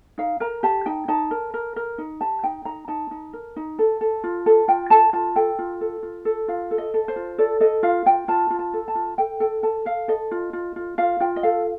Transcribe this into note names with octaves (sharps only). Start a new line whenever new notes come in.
D#4 F5
A#4 A#5
G4 A5
D#4 G5
D#4 A5
A#4
A#4
A#4
D#4
G4 A5
D#4 G5
D#4 A#5
D#4 A5
D#4
A#4
D#4
A4
A4
F4
A4
F4 G5
A4 A5
F4 A5
A4 G5
F4
A4
F4
A4
F4 F5
A4
D#5
A4
C5
F4
A4 D5
A4 D#5
F4 F5
F4 G5
F4 A5
F4
A5
A4
A5
F4
A4 G5
A4 G5
A4 A5
A4 F5
A4 D#5
F4
F4
F4
F4 F5
F4 G5
D#5
A4 F5